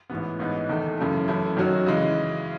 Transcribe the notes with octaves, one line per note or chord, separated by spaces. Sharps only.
A1 G#2 E3 B3
A1 G#2 E3 B3 D#4
E2 D#3 A3
F#2 C#3 E3 A3
F#2 E3 A3 E4
F#2 D#3 F#3 C#4 F#4
C#3 E3 G#3